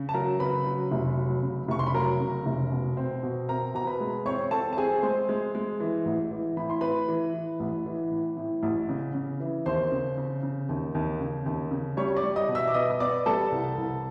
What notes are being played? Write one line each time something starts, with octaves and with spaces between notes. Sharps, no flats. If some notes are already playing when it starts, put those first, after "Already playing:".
Already playing: C#3
A5
F#3 A#4 A#5
C#3 B4 B5
F#3
F1
F#3
C#3
F1 C#6
C6
B5
F#3 A#4 A#5
C#3
F1
B2
C4
B2
C4 A#4 A#5
B2 A#5
B4 B5
G#3
C4 C#5 C#6
C4 A4 A5
A5
C4 G#4 G#5
G#3 C5 C6
G#3
G#3
E3
A1
E3
A2 B5
C6
A2 B4 B5
E3
E3
A1
E3
A2
A2
A1
C#3
C#3
E3
D#2 C5 C6
C#3
C#3
C#3
D#2
D#2
C#3
D#2
C#3
G3 C#5 C#6
C#6
D5 D6
G3
D#5 D#6
B2
E5 E6
D6
B3 D#5 D#6
D#6
B3 D5 D6
G3 A4 A5
C2
C2